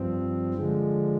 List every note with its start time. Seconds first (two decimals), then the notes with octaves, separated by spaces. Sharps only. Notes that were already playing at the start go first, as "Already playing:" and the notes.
Already playing: G2 F3 C4
0.54 D3 F3 G#3